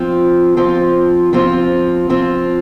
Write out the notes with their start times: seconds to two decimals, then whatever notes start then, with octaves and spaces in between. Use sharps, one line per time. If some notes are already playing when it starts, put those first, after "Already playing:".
Already playing: F3 C4 F4
0.57 F3 C4 F4
1.33 F3 C4 F4
2.10 F3 C4 F4